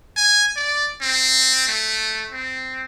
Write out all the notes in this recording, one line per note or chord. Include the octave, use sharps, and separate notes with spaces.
G#5
D5
C4
A3
C4